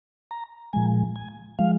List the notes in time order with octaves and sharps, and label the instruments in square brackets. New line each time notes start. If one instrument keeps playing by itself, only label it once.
[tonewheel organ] A#5
A#2 F3 G#3 G#5
G#5
F3 G#3 F5